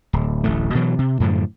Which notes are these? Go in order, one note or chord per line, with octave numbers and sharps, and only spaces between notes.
D1
D1 A1 A3
B2 E3 F#3
C3
F#2 A2 D3 F3